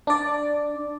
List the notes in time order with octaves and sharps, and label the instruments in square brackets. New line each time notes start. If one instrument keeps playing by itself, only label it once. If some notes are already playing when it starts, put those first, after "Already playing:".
[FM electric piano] D4 D5